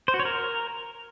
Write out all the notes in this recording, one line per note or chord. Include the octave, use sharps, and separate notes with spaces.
C5
F#4
C#5
A#4